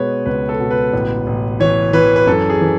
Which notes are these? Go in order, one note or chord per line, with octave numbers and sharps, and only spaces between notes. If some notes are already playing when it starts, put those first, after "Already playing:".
Already playing: B2 G#3 B4 C#5
C#2 B4
A4
B2
B4
A1
A1
E3 C#5
E3 B4
B4
F#2 A4
G#4
E3